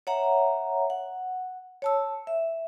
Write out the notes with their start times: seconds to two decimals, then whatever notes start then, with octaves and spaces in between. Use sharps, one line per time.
0.07 C#5 E5 F#5 A#5
0.90 F#5
1.82 C#5 A5 E6
2.27 E5